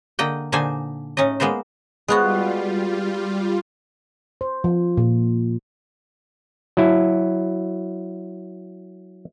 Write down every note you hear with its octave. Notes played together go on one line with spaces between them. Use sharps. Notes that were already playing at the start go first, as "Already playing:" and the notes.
D3 A#3 D#5 G5
A#2 D3 D4 D#4 C5 G#5
A2 C#4 D#4 D#5
G#3 A#3 B3 A#4 C5
G3 G#3 B3 F4 F#4
C5
F3
A#2
F#3 E4